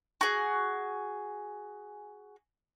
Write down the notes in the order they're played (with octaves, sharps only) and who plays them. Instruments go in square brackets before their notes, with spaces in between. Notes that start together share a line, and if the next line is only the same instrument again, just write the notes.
[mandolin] F#4 G#4